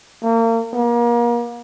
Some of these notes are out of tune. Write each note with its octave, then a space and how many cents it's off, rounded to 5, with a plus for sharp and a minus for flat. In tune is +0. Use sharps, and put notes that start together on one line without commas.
A#3 -35
A#3 +35